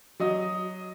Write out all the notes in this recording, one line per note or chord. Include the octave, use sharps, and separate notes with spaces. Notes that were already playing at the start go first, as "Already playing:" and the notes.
F#3 D#5 D#6